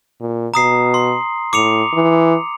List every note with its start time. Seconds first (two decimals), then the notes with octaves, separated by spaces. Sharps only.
0.20 A#2
0.54 B2 A#5 D#6 C7
0.94 C6
1.53 A2 D6 C#7 F7
1.93 E3